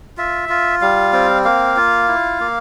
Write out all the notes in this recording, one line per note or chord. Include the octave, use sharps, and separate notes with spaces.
F4 E5
F4
G3 F5
C4
A#3 F5
F4
E4
A#3